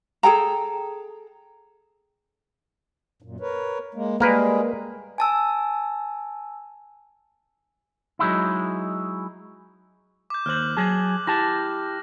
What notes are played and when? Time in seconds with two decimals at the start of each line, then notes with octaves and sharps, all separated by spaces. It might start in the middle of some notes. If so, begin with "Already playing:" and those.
0.23 G#4 A4 G5 A#5
3.22 F#2 A#2
3.40 A#4 B4 C#5
3.94 G#3 A#3
4.20 G3 G#3 A#3 G#4 A#4 B4
5.18 G#5 A5 E6
8.19 F#3 G#3 D#4 E4
10.30 D6 G6
10.46 D#2 C5 F6 F#6 F#7
10.77 F#3 G#4 A5
11.27 E4 G4 A5 A#6